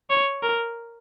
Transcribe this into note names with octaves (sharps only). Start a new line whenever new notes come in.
C#5
A#4